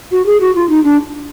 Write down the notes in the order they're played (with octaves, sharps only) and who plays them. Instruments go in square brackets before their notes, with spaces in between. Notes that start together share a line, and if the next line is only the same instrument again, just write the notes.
[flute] F#4
G#4
F#4
F4
D#4
D4